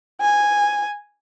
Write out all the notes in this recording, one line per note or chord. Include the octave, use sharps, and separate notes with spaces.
G#5